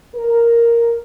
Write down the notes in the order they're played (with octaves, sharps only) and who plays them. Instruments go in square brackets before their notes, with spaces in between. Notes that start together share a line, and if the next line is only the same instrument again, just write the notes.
[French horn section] A#4